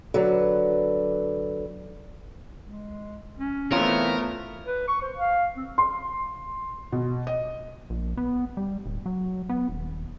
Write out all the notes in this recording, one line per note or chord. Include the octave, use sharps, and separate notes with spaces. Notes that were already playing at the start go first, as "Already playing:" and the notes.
D3 F#3 B4
G#3
C#4
E3 A3 B3 C4 F4 A#4 C#5
B4
C#6
C5
F5
C4
C6
B2
D#5
A#1
B3
G3
D1
F#3
B3
D#1